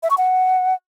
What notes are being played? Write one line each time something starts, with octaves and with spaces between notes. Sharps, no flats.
E5
C#6
F#5